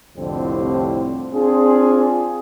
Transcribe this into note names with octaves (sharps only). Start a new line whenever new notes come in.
C2 F2 A2 D3 G3 C4
C4 D4 F4 G#4